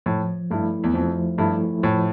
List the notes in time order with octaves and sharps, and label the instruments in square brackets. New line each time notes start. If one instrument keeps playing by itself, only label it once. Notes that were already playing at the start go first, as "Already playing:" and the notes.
[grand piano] A2 [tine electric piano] F3
[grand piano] G2 [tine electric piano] A3 E4
[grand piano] E2
[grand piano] F2 [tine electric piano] F3
[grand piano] G2 [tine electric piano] A3 E4
[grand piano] A2 [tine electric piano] F3